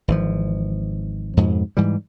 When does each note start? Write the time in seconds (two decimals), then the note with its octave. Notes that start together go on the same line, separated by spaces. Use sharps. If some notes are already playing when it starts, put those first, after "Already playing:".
0.08 G#1 E3 F3
1.37 F2 G#2 B2
1.77 G#2 E3 G3